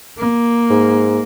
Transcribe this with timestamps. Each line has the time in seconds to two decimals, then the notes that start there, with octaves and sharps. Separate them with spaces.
0.18 A#3
0.70 G#2